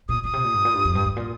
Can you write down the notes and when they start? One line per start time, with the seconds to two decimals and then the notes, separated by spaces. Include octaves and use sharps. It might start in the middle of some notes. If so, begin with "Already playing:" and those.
0.09 A#2 D#6
0.24 A#2 D#6
0.33 C3
0.44 A#2
0.54 G2
0.65 A#2
0.74 G2
0.85 F2
0.95 G2
1.06 G2
1.16 A#2